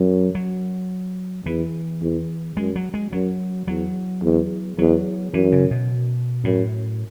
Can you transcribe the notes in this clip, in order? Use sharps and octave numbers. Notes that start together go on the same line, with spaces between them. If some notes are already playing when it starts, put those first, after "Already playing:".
Already playing: F#2 F#3
F#3
E2 E3
E2
F#2 G#3
F#3
G#3
F#2 F#3
E2 F#3
E2
E2 F#3
F#2 E3
C#3
B2
F#2 A2